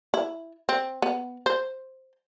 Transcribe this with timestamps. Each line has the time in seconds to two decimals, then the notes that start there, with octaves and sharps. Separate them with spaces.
0.14 E4
0.69 C4
1.02 B3
1.46 C5